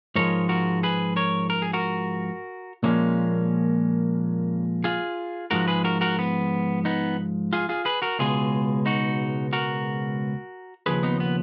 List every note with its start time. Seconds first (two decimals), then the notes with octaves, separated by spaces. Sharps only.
0.15 G#2 F3 G#3 A#4 C#5
0.49 F#4 A#4
0.83 G#4 B4
1.16 A#4 C#5
1.50 A#4
1.62 G#4
1.73 F#4 A#4
2.83 A#2 F3 G#3 A#3 C#4
4.84 F4 G#4
5.51 G#2 F3 G#3 F#4 A#4
5.68 G#4 B4
5.84 F#4 A#4
6.01 F#4 A#4
6.19 B3
6.85 B3 D#4
7.53 F4 G#4
7.69 F4 G#4
7.85 G#4 B4
8.02 F#4 A#4
8.19 C#2 B2 G#3 F4 G#4
8.86 D#4 F#4
9.53 F#4 A#4
10.86 D#2 C#3 F3 G#4 B4
11.03 B3 D#4
11.20 B3